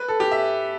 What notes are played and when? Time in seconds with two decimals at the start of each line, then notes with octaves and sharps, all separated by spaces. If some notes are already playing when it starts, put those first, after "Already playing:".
Already playing: B4
0.08 A4
0.20 G4
0.32 E5